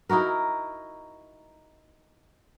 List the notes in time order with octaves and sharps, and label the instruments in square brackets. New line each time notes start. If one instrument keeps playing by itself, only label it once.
[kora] D#4 E4 F#4 A#4